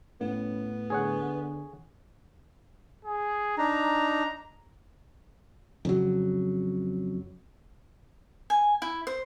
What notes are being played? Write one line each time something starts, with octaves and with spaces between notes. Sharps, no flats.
A2 B3 C#4
D3 G#4 C#5 F#5
G#4
D4 D#4 A#5
F2 C#3 F#3
G#5
E4
C5